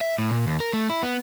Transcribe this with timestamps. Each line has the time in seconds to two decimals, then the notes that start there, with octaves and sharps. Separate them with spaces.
0.01 E5
0.18 A2
0.31 A#2
0.47 D#2
0.60 A#4
0.73 A3
0.90 E4
1.03 B3